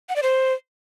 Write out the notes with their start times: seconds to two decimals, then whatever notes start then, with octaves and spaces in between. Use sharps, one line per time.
0.09 F#5
0.16 D5
0.23 C5